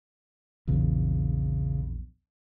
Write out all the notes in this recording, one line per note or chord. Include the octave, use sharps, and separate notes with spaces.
A#1 E2 C#3